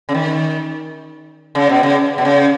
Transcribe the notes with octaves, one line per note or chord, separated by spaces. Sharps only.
C#3
D#3
C#3
B2
C#3
B2
C#3